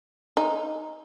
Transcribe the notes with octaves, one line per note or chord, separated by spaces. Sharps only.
D#4